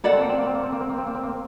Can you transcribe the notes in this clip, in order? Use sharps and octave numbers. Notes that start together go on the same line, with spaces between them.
A#3 A4 D5 F#5
C4
A#3
C4
A#3
C4
A#3
C4
A#3
C4
A#3
C4
A#3
C4
A#3